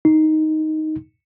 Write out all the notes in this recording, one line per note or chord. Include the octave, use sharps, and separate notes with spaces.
D#4